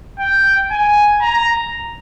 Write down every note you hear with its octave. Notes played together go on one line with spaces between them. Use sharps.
G5
G#5
A#5